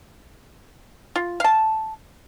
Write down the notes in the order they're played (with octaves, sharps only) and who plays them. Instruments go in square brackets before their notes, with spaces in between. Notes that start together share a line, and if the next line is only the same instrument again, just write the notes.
[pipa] F4
F5 A5